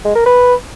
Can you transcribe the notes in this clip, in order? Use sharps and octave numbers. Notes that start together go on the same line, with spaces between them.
G#3
A#4
B4